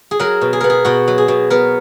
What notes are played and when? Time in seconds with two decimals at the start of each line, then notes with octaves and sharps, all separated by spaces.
0.11 G#4
0.20 F#3 A#4
0.41 B2
0.53 G#4
0.61 B3 A#4
0.70 G#4
0.85 B2 F#4
1.08 F#3
1.18 G#4
1.28 B2
1.50 B3 A#4